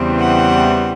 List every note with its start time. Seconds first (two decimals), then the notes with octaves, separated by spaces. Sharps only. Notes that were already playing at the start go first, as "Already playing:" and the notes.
Already playing: E2 C#3 E3 G3 C4
0.19 F#5